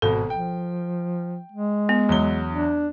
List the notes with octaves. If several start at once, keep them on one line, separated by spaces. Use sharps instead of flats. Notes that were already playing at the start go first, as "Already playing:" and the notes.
G#1 B2 A4
F3 G5
G#3
B3
E2 F#3 G7
D4